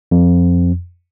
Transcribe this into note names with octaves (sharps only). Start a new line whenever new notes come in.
F2